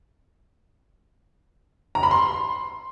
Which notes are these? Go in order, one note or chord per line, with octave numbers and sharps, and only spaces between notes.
A#5
B5
C6